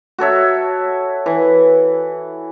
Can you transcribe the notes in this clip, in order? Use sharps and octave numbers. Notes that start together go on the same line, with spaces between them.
F#4 A4 C#5 E5
E3